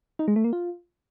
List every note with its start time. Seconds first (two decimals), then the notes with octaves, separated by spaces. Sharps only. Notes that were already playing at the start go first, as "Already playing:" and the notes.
0.19 D#4
0.28 G#3
0.36 A3
0.44 A#3
0.53 F4